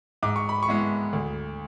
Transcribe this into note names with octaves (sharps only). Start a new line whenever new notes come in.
G#2 D6
C#6
B5
C#6
G#3 B3 E4
D2